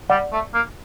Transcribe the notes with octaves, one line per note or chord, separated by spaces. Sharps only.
G3 D5 F#5
A3
A#3